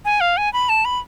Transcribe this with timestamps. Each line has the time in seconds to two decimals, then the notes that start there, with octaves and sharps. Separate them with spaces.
0.05 G#5
0.21 F5
0.37 G#5
0.53 B5
0.69 A5
0.85 B5